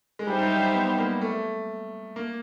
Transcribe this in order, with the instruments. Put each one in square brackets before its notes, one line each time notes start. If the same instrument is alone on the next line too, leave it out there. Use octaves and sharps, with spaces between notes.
[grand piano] G#3
[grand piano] G3 [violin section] D#4 G4 C5 E5
[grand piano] G3
F#3
G3
B3
A#3
A3
A#3